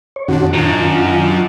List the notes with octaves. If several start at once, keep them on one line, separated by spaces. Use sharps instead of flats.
C#5
F2 A#2 D#3 C#4 D4 F#4
F#2 D#3 D4 F4